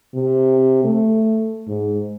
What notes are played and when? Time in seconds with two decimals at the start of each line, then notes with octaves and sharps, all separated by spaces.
0.14 C3
0.84 A3
1.68 G#2